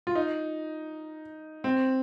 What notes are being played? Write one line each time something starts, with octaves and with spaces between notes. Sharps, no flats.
F4
D#4
C4